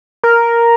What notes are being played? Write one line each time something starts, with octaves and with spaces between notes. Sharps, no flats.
A#4